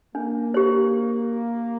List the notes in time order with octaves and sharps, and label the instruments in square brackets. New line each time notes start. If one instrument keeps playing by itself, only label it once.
[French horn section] A#3 [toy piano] D4
[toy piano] G4 C5